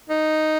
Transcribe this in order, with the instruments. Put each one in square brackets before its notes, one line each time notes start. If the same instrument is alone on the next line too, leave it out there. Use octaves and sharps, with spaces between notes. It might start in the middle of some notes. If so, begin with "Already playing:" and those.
[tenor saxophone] D#4